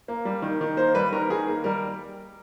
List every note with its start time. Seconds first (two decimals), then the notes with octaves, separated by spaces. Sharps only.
0.08 A#3
0.25 G3
0.42 D#3
0.61 D#3
0.77 A#3 C5
0.95 G3 B4
1.12 D#3 A#4
1.30 D#3 G#4
1.47 A#3
1.64 G3 A#4